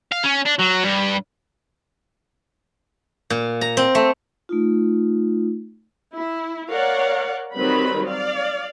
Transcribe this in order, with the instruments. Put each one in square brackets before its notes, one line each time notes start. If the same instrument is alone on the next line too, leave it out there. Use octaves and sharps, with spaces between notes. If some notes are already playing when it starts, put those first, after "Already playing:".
[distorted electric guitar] F5
C#4
D4
F#3
G2
[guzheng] A#2
A#5
C4
A3
[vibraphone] A3 D#4 F4
[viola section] E4
A#4 C#5 D5 F5 F#5
D#3 F#3 G3 C4 B4 B5
D5 F5